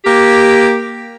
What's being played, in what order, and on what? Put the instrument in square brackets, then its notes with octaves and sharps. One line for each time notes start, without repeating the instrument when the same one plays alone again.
[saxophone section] A#3 G4